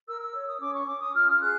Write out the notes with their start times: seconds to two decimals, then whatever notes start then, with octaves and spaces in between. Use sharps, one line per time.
0.08 A#4 E6
0.21 E6
0.34 C#5
0.48 D#6
0.61 C#4 D6
0.74 C#6
0.87 C#4 D6
1.00 D#6
1.14 F4 F6
1.30 F6
1.40 G#4 F#6